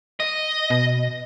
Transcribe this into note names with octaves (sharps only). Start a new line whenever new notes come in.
D#5
B2